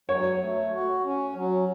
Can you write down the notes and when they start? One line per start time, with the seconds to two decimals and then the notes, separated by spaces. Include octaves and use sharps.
0.09 F#3 C#5
0.40 A3
0.72 F#4
1.04 C#4
1.34 F#3